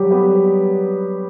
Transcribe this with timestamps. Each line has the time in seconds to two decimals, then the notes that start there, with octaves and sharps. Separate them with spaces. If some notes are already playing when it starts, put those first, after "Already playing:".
Already playing: F#3 G3 F#4 G4
0.11 B3 B4